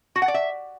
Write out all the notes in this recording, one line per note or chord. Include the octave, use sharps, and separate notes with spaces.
F#4
F#5
D5
E5